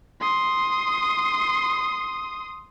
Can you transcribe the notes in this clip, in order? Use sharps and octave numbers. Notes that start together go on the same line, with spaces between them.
C6 D#6